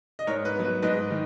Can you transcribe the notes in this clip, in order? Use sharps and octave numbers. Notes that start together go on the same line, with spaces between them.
D#5
G#2 A#4 C#5
B4
F#3 B3
B4
G#2 B4 D#5
D#3